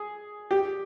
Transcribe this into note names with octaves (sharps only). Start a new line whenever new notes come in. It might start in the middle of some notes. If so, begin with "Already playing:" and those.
Already playing: G#4
G4